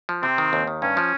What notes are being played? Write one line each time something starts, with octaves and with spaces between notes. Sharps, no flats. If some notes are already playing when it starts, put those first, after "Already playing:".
F3
C3 C4
D#3
D#2
D#3
G2 C#4
F3